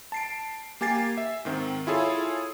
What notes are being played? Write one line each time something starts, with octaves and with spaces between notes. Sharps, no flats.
A5 C7 D7
A#3 G4 G#5 A6 C7
E5
G#2 D#3 C4
E4 F4 G#4 A4 C#5